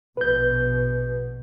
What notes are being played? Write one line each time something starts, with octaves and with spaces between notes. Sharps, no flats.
A#1 B2 B4 G6